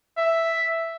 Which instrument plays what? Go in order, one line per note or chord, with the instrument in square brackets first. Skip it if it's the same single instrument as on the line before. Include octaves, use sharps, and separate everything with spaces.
[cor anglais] E5